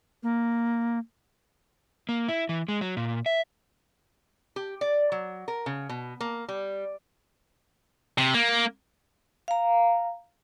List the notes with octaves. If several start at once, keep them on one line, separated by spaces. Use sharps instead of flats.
A#3
A#3
E4
E3
G#3
F#3
A#2
E5
G4
D5
F#3
A#4
C#3
B2
A#3
G3
C3
A#3
F5 A#5